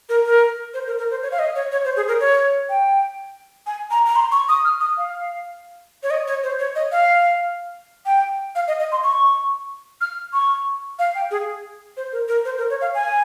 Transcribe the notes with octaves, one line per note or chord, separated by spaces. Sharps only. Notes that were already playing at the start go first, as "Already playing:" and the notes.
A#4
A#4
C5
A#4
A#4
C5
C#5
F5
D#5
C#5
C#5
C5
G#4
A#4
C#5
G5
G#5
A#5
A#5
C6
C#6
D#6
F6
D#6
F5
C#5
D#5
C#5
C5
C#5
D#5
F5
G5
F5
D#5
D#5
C6
C#6
F6
C#6
F5
G5
G#4
C5
A#4
A#4
C5
A#4
C#5
F5
G#5